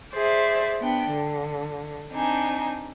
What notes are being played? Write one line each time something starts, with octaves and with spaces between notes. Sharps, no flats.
G#4 C5 D5 E5
B3 D4 G5
D3
C4 D4 D#4 G#5